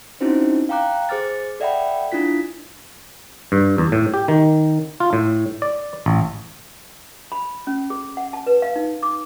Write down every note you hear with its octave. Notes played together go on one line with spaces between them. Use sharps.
C4 C#4 D#4 E4 F#4 C5
F5 G5 A#5 D6 F#6
G#4 C5 D6 F6 A6
A4 D5 E5 F#5 G5 B5
D4 E4 F4 B6
G2
E2
A2
G4
D#3
F4
A2
D5
A1
B5
C#4
G#4
F#5
A5
B4
F5
D#4
D6